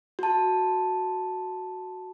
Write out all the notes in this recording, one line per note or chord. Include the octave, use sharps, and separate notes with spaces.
F#4 A5